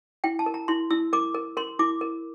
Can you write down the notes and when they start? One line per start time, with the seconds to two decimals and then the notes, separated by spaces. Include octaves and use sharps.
0.24 E4 G5
0.39 A5
0.46 A#4
0.54 A#5
0.68 E4 C6
0.90 E4 E6
1.13 A#4 D6
1.34 A#4
1.57 A#4 C6
1.79 E4 D6
2.01 A#4